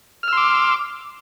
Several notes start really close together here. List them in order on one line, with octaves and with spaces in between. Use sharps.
F6 E6 C6 D6